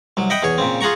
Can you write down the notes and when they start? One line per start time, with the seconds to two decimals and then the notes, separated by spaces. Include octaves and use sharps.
0.17 C2 F#3
0.30 D#5 E5 F#5 G5 B5
0.43 E2 G#4 C#5
0.58 A#2 C#3 C4
0.81 F4 G#4 F#5 A#5 C#6